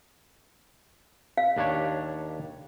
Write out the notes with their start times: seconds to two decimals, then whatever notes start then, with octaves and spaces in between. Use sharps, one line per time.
1.38 F5
1.56 D#2 D4 C#5